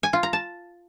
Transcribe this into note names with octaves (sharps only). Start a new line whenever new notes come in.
G#5
F4
A#5
A5